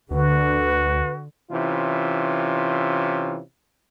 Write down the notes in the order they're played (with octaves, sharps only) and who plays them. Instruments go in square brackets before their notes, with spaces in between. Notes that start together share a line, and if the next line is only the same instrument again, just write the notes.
[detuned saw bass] D2 [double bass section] D3 [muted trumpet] F#4 [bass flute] B4
[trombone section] C3 E3 C#4 E4 F4